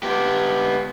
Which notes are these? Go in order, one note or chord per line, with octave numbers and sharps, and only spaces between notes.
B3 G4